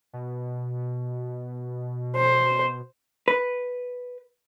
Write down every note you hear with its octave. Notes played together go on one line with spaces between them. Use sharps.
B2
C5
B4